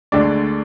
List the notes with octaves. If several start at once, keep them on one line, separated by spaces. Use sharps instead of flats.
D2 D3 G#3 D4 D5